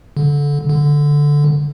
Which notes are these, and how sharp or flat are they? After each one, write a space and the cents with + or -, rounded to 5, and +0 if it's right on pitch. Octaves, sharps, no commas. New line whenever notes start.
D3 -20
D3 -5